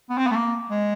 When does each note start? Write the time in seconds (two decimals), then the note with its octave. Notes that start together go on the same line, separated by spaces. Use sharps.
0.10 B3
0.17 C4
0.27 B3
0.31 A3
0.35 A#3
0.70 G#3